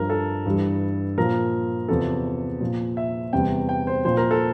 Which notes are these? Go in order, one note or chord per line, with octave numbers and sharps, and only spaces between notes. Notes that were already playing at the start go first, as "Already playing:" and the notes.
Already playing: G2 F3 A#4
A4
G2 E3 G3
A#2 F3 A#4
E2 C3 F3 A4
A#2 F3
E5
E2 C3 G3 G5
G5
C5
A#2 F3 C5
A#4
A4